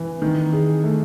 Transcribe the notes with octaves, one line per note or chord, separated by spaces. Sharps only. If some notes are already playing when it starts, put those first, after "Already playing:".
Already playing: E3
D#3
G#4
A3